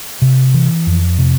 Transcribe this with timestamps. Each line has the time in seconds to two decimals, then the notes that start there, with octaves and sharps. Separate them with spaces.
0.22 C3
0.54 E3
0.87 F2
1.18 C3